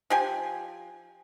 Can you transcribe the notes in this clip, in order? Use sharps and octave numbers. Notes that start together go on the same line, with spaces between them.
F3 G4 G#5